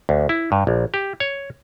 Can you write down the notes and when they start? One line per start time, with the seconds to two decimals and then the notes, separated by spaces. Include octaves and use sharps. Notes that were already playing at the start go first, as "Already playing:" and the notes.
0.09 D2
0.29 E4
0.52 G2
0.67 A#1
0.94 G4
1.20 C#5